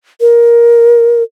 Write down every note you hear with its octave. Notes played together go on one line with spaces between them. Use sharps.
A#4